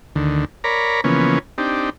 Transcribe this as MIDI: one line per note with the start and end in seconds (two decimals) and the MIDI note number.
0.15 0.45 38
0.15 0.45 50
0.15 0.45 51
0.64 1.01 70
0.64 1.01 73
0.64 1.01 74
0.64 1.01 82
0.64 1.01 83
1.04 1.39 49
1.04 1.39 52
1.04 1.39 53
1.04 1.39 58
1.04 1.39 59
1.04 1.39 61
1.58 1.90 60
1.58 1.90 62
1.58 1.90 63
1.58 1.90 67